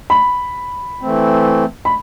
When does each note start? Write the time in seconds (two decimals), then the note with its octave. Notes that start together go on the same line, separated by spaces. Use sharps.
0.10 B5
1.01 E3 A3 C4
1.85 B5